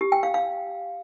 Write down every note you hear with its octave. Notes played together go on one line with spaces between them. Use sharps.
G4
G5
F5
F5